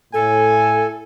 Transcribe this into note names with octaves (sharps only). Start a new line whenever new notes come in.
A2 A4 G#5